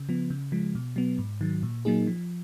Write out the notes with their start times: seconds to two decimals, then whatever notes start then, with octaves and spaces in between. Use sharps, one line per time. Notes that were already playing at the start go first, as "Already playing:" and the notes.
Already playing: C#3
0.09 F3 B3
0.30 C#3
0.52 F3 G#3
0.75 B2
0.96 F#3 B3
1.18 G#2
1.41 D#3 F#3
1.63 A#2
1.85 F#3 A#3 D#4 G#4
2.07 F3